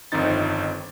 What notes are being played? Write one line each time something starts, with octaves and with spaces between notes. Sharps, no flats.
G1 F2 D#3 C4 D#4 A6